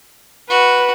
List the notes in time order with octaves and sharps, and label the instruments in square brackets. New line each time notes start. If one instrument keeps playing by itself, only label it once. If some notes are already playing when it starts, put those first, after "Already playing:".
[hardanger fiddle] F#4 [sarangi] B4